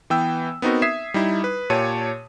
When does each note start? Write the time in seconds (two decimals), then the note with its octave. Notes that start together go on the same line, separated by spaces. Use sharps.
0.10 E3 B3 G5 E6
0.62 B3 C4 D#4 F#4 A#4
0.82 E5 D#6 G#6 B6 C7 E7
1.14 G3 D#4 E4
1.44 B4
1.70 A#2 G4 C#5 A5 D#7